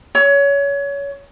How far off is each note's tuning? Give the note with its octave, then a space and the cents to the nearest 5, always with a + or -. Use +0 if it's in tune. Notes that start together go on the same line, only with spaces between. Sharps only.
C#5 +25